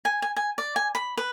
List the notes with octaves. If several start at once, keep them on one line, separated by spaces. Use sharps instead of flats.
G#5
G#5
G#5
D5
G#5
B5
B4